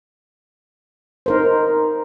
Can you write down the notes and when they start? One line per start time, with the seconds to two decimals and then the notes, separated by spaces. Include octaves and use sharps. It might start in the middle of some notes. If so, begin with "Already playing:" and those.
1.26 D#4 A#4 C5